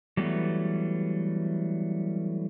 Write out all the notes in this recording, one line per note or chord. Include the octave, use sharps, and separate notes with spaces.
E3 F#3 G3 A3 B3